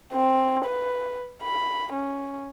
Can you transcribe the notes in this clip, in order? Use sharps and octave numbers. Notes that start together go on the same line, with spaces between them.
C4
B4
B5
C#4